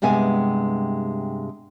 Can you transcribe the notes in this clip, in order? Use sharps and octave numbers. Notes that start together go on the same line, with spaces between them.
G2 C3 G#3 B3 G#5